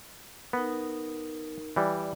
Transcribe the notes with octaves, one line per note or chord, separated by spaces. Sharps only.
B3 D#4 A#4
E3 G3 D5